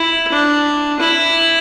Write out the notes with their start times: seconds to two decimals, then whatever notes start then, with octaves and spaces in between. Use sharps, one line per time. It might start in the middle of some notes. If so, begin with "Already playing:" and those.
Already playing: E4
0.32 D4
1.00 E4